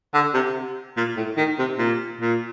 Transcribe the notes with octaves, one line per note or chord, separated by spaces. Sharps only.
D3
C3
A#2
A2
D#3
C3
A#2
A#2